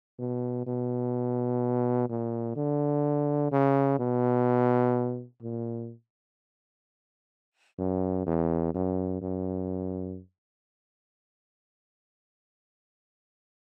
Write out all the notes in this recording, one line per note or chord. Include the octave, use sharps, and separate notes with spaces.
B2
B2
A#2
D3
C#3
B2
A#2
F#2
E2
F#2
F#2